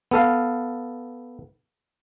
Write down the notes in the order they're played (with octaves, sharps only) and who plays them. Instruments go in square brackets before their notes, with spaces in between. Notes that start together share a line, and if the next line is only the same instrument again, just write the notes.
[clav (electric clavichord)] B3 A4 F5